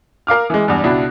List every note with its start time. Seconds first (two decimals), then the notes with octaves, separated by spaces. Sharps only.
0.27 A#4 F5 D6 F6
0.50 E3 G#3
0.68 E2 G2
0.84 C#2 B2 D4 E4